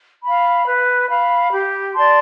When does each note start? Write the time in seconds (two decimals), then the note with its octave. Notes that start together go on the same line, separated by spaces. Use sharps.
0.23 F5 B5
0.66 B4
1.09 F5 B5
1.52 G4
1.95 D5 A5 C6